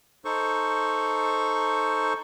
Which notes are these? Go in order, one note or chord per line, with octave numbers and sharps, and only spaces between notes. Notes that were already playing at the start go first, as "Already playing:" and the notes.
D#4 A4 C5 C#6